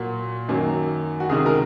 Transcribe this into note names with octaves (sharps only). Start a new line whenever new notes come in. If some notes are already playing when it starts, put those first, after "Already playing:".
Already playing: A#2 F#3 A#3 F#4
F#2 D#3 F#3 A#3
F#4
C#2 C3 D#3 G#4
A#4